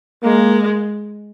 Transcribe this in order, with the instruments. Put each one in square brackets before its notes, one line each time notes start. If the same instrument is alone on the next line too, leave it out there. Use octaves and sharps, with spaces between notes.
[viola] G#3 [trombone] A#3